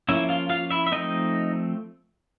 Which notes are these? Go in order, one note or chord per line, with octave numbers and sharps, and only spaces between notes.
F3 A#3 C#4 E4 E5
F4 F5
F4 F5
E4 E5
E5
F3 A3 C4 D#4 D#5